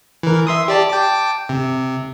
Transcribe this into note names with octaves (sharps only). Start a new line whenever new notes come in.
E3 A#4
E5 C6 D#6
G4 D5 A5
G5 A5 D6
C3